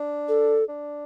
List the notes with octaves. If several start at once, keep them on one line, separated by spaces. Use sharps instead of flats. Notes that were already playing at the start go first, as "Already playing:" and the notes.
Already playing: D4
A4
D4